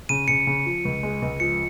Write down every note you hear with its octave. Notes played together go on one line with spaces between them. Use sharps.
C#3 D#7
C#3 C#7
C#3
F3
C#2
G#3
C#2
F3 C#7